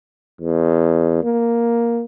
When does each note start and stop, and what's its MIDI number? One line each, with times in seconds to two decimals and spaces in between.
0.41 1.19 40
1.23 2.04 58